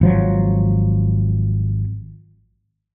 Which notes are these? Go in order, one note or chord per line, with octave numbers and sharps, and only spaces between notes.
G#1 F3 F#3